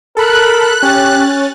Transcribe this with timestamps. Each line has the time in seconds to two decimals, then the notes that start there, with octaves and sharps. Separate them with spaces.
0.17 A4 A#4 B5 F#6
0.83 C#4 G4 A6